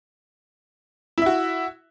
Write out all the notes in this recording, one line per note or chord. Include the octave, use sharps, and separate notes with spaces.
E4 F#4 E5